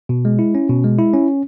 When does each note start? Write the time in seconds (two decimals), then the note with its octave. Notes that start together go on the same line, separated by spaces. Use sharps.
0.09 B2
0.25 G#3
0.39 E4
0.55 C#4
0.69 B2
0.84 G#3
0.99 E4
1.13 C#4